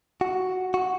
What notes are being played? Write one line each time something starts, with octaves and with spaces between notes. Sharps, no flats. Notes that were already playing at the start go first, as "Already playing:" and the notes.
F#4
F#4